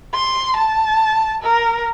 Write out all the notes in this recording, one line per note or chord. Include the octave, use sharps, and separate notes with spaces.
C6
A5
A#4